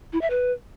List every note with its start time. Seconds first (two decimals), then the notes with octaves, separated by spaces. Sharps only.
0.13 E4
0.21 E5
0.30 B4